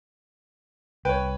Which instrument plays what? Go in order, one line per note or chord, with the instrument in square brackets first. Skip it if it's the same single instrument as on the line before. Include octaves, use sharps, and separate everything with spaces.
[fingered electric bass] C2 [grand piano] B4 C#5 [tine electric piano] G5